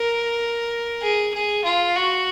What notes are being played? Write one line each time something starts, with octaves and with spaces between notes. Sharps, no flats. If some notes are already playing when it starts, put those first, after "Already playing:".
Already playing: A#4
G#4
G#4
F4
F#4